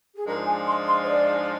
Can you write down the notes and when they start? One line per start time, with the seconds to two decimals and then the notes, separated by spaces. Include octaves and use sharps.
0.16 G#4
0.26 G#2 F3 G#3 D4 F4 A#4
0.47 G#5
0.67 C6
0.88 C6
1.04 C5
1.09 D5